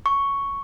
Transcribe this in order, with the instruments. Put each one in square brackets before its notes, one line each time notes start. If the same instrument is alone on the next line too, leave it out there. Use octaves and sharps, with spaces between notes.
[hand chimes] C#6